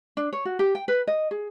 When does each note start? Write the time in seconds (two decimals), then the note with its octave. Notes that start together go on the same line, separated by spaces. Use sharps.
0.17 D4
0.33 C#5
0.45 F#4
0.59 G4
0.75 G5
0.88 B4
1.07 D#5
1.31 G#4